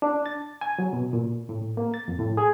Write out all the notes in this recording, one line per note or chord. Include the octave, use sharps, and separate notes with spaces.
D4
A6
G#5
F#3
B2
A#2
A2
A#3
A6
F2
A2
G#4